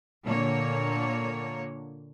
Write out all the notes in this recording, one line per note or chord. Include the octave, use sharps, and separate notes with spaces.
A#2 D3 A#3 C#5